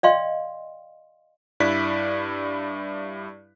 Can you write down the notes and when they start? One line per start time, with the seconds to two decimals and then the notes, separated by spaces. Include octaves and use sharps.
0.03 D5 D#5 F5 G5 C6
1.60 G2 E4 D5 F#6 B6